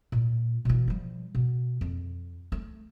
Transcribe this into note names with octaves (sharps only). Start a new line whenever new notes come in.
A#2
B2 E3
F3 G3
B2
F2
A3